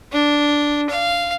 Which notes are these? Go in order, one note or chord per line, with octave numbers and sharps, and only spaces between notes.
D4
F5